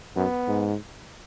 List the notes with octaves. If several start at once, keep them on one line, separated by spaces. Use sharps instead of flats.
F#2 B3
G#2